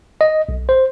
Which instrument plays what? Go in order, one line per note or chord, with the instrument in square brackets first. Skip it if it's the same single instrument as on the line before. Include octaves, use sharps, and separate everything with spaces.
[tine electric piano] D#5
B1
C5